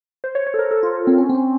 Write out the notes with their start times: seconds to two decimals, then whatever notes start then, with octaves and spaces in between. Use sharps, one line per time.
0.24 C5
0.35 C#5
0.47 C#5
0.54 A4
0.59 A#4
0.71 A4
0.83 F4
1.07 C4
1.18 C#4
1.29 C4
1.35 C#4